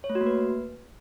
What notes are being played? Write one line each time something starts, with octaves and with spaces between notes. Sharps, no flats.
C#5
A3
F#4
A#3
B4